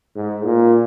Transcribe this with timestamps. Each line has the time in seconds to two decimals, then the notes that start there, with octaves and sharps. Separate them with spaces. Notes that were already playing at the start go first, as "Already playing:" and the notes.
0.16 G#2
0.44 A#2